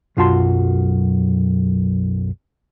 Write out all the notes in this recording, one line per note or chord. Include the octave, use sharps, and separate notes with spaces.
B1 F#2 F4 F#4 A5 C6